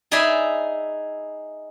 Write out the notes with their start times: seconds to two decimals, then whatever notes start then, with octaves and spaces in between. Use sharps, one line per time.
0.11 D#4 G#4 D5 E5 G#5 B5